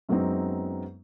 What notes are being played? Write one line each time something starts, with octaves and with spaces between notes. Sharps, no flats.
F#2 F#3 G#3 B3 C4 D#4